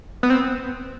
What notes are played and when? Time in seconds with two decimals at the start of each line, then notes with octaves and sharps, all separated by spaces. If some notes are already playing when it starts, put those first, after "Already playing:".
0.23 B3
0.30 C4